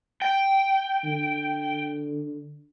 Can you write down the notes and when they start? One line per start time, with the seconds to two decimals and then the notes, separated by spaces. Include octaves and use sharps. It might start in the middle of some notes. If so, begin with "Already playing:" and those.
0.22 G5
1.04 D3